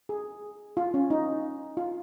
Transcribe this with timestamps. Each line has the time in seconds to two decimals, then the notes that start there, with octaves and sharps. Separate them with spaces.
0.09 G#4
0.77 F4
0.94 C#4
1.10 D#4
1.77 F4